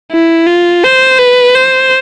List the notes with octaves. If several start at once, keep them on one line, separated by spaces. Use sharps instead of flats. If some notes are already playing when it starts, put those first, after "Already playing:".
E4
F4
C5
B4
C5